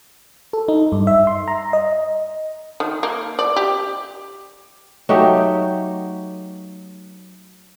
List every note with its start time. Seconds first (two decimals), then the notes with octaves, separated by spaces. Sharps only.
0.53 A4
0.68 D#4
0.92 G2
1.07 E5
1.27 C6
1.48 A#5
1.73 D#5
2.80 D#3
3.03 A#3
3.39 D5
3.56 G4
5.09 F#3 A3 D#4 G4